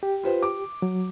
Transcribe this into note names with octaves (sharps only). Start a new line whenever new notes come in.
G4
F4 B4 C5
D6
F#3